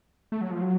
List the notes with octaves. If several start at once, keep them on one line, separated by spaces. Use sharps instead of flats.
A3
F#3
F3
F#3